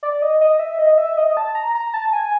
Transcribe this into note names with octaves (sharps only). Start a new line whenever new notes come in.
D5
D#5
D#5
E5
D#5
E5
D#5
A5
A#5
A#5
A5
G#5